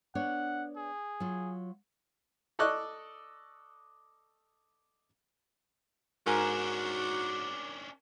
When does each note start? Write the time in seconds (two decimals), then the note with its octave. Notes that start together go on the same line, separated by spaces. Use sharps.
0.15 B3 D4 C#5 F#5
0.77 G#4
1.20 F#3 F4
2.59 A4 D5 D#5 C#6 F#6
6.27 G#2 C#4 D4 F#4 A#4 G#5